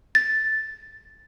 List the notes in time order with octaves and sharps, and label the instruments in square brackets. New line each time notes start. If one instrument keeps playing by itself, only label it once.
[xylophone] A6